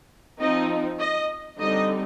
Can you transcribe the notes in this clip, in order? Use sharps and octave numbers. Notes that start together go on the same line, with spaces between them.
F3 C4 D#4 D#5
D#5
D3 G3 C4 D#4 D#5